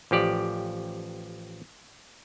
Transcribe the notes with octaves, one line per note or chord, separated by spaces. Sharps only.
A1 F3 G4 D5